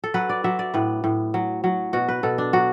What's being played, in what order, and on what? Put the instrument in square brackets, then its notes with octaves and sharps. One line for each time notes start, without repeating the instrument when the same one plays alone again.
[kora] A4
F#3 B4
D5
F#3 E5
D5
A2 B4
A2
F#3
F#3
B2 F#4
B4
B2 A4
D4
F#3 F#4